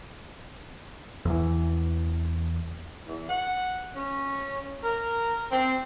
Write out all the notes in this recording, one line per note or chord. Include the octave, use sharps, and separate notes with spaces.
E2 E3
E2
F#5
C#4
A#4
C4